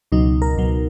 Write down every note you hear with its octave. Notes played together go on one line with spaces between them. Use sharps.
C#2 B2 F#3 D#4
A#4
C#2 B2 F#3